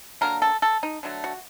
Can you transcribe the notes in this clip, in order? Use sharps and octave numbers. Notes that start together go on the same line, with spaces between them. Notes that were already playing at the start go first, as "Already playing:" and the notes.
D3 F#3 A#3 A#4
A4
A4
D#4
D3 F#3 A3
F#4